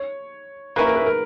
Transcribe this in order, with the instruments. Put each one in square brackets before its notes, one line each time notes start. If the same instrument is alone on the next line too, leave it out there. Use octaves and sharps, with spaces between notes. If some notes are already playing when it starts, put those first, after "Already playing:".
Already playing: [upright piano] C#5
[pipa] A#3 C#4 E4 [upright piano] B4
[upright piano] A#4
B4
A#4